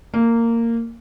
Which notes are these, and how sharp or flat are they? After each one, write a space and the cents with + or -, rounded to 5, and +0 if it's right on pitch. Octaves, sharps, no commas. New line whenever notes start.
A#3 -15